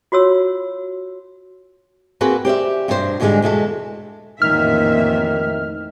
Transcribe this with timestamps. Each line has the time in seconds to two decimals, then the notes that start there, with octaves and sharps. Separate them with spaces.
0.12 F4 F#4 C#5 E6
2.21 A#3 C4 F#4 G#4 B4
2.45 G4 C5 D5 E5
2.88 G2 B2 D4 F4 C5
3.20 G#2 B2 D3 F3 G3 G#3
3.42 E2 B2 G#3 A4
4.42 A1 F2 A#2 D#3 E5 F6